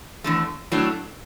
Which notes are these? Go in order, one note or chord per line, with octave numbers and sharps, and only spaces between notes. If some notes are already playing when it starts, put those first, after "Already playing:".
E2 D3 A3
A2 F#3 A3 D4